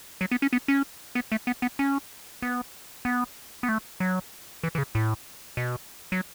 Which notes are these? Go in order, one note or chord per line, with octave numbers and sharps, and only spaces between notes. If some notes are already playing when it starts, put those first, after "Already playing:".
F#3
B3
C#4
B3
C#4
B3
A3
B3
B3
C#4
B3
B3
B3
A3
F#3
E3
E3
C#3
A2
B2
F#3